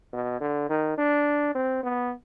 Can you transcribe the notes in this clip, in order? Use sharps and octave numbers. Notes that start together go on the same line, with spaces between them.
B2
D3
D#3
D4
C4
B3